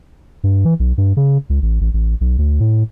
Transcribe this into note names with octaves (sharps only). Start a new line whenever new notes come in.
G2
E3
B1
G2
C#3
C#2
A1
A1
A1
B1
D2
A2